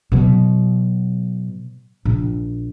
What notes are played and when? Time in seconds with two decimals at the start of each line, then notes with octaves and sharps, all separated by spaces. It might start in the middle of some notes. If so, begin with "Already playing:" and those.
0.12 B2 F#3
2.05 A#1